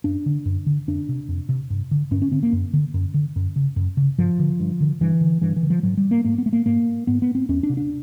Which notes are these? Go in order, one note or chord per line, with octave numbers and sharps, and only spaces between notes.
F#2 D4
D3
F#2
D3
F2 D4
C3
F2
C3
G2
D3
G2 C#4
C#4
D3 C4
A#3
F#2
D3
F#2
D3
F#2
C#3
F#2
C#3
G2 F3
D3
G2
D3
G2 E3
D3
G2 E3
E3
D3
F3
G#2 F#3
G3
A#3
G#2 A#3
B3
A3
A#3
G#2 A#3
G#2 B3
B3
C4
E2 C#4
D4
C3
D4